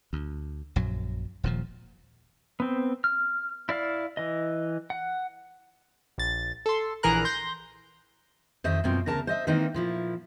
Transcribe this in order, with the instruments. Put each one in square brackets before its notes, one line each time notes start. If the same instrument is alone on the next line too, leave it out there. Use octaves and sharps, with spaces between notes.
[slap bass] D2
A#1 F#2 F#3
D#1 A#2 F3
[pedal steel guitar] B3 C4
F6
E4 D5 F5
E3 D#5
F#5
[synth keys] A#1 A6
A4 C6
A#1 E3 G#4 A#4 A#5 F#6
C6 G6 A#6
[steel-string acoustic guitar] F2 D#3 C5 D#5 E5
F#2 B2 F3 C4
D2 C#3 A#4 A5 A#5
C5 D#5 E5
D#3 E3 G#3 A#3 C4 D#4
A#2 F3 E4